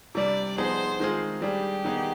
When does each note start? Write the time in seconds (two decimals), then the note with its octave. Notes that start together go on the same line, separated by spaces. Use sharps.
0.15 C3 G3 D4 D5
0.58 F3 B3 D#4 G#4 C5
1.00 D#3 G#3 C4 F4 G#4
1.42 G3 D4 G4 G#4
1.84 D#3 B3 D#4 G#4